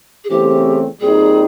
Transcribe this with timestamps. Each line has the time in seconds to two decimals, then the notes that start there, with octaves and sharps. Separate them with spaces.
0.24 G#4
0.29 E2 C#3 E3 A3 C4 G4
1.00 A#2 G3 C4 D#4 G#4